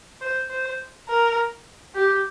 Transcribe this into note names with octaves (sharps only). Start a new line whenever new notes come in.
C5
C5
A#4
G4